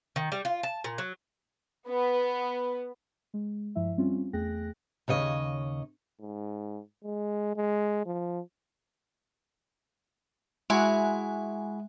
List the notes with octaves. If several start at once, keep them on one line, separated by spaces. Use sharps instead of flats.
D#3
G3
F4
A5
A#2
F#3
B3
G#3
G2 F3 E4 E5
G3 C4 C#4 F4
E2 A3 G#4 G5 F#6 A#6
D#2 C#3 C#5 D#5
G#2
G#3
G#3
F3
G#3 E4 F#4 G#4 E5 G#5